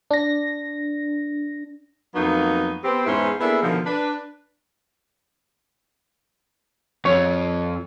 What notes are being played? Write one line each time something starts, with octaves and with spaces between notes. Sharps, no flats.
D4 A#6
F2 F#3 A#3 B3 D#4
B3 C4 G4
E2 G#2 C#4 E4 B4 C5
A#3 B3 D4 E4 G#4 A4
B2 D3 D#3 F3
D4 B4
F2 C#5